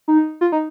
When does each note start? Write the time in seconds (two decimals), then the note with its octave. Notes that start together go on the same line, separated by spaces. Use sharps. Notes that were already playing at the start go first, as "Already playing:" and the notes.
0.08 D#4
0.41 F4
0.52 D#4